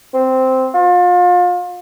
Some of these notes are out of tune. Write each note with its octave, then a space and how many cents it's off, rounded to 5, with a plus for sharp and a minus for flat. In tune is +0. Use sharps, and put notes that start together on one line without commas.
C4 -5
F4 +35